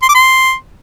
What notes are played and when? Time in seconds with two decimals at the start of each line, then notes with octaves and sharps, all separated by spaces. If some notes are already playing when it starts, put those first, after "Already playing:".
0.02 C6
0.08 D6
0.14 C6